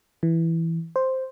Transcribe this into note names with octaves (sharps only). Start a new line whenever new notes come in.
E3
C5